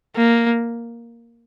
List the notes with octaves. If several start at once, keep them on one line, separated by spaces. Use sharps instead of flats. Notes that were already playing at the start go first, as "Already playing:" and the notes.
A#3